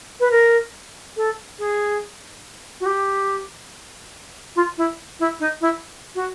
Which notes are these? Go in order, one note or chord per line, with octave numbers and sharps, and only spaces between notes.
B4
A#4
A4
G#4
F#4
G4
F4
E4
E4
D#4
E4
F#4